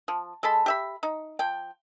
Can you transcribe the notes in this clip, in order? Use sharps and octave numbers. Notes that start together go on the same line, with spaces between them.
F3
G#3 A4 A5 B5
G4 E5 B5
D#4
F3 G5